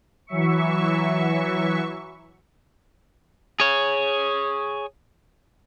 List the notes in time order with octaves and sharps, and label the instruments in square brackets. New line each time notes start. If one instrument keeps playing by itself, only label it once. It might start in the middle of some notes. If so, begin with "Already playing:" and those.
[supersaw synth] E3 F#3 E5 C#6
[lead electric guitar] G#4 C#5